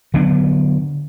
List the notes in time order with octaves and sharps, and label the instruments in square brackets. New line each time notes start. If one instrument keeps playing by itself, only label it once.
[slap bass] D3 F#3 B3 D4